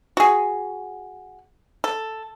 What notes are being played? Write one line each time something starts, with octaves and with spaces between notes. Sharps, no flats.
F#4 G#4
A4